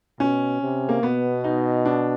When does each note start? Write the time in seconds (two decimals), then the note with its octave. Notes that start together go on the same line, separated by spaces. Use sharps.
0.20 B2 C#4
0.62 C3
0.89 A#3
1.03 B2 B3
1.44 D#4
1.85 D4